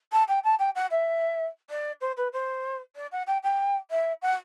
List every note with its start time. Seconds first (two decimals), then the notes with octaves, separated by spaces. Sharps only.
0.12 A5
0.28 G5
0.44 A5
0.59 G5
0.75 F#5
0.91 E5
1.70 D5
2.01 C5
2.17 B4
2.33 C5
2.96 D5
3.12 F#5
3.27 G5
3.43 G5
3.91 E5
4.22 F#5